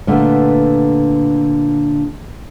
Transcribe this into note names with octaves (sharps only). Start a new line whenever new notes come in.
A#2 D3 A3 B3